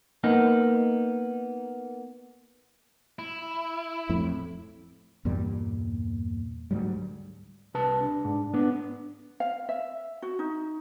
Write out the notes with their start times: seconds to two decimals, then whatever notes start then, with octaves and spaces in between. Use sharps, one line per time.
0.24 A#3 B3 D#4
3.19 E4
4.09 F2 A2
5.25 E2 G2 A#2 G3
6.71 D2 G#2 F#3 G3
7.74 C2 B4 A5
8.00 D4
8.25 G#2
8.54 B3 D4
9.40 F5
9.69 E5
10.22 F#4
10.39 D#4